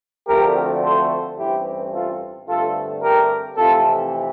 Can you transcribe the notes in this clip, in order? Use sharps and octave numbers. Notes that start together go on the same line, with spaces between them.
D2 D3 F3 A3 C4 G4 A#4
A4 C5
A1 G2 E3 A3 C4 E4 G4
F4 A4
G2 D3 A3 C4 F4 A4
G4 A#4
F2 C3 E3 A3 C4 F4 A4